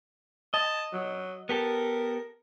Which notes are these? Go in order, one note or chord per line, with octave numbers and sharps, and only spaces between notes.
D#5 A5
F#3
B3 G4 A4 A#4